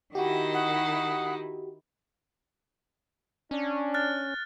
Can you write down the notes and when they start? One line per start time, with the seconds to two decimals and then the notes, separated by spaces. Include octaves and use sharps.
0.15 D#3 D#4 E4 F#4 G4 F#5
0.54 F#5 D#6
3.51 C#4 D4
3.94 F6 F#6 A6